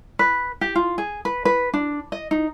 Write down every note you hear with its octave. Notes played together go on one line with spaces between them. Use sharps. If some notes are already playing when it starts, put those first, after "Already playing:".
B4
G4
F4
G#4
B4
B4
D4
D#5
D#4